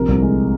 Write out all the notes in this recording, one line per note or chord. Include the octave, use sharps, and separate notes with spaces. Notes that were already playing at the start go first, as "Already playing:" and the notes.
Already playing: A#1 C3 A#4
C2
G#3